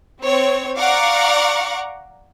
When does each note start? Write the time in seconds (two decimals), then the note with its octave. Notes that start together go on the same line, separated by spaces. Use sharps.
0.22 C4 C#5
0.77 D5 F5 F#5 A#5 C#6 D6